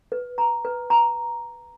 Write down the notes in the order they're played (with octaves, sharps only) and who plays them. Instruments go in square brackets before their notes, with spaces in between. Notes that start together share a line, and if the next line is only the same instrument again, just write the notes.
[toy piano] B4
A#5
B4
A#5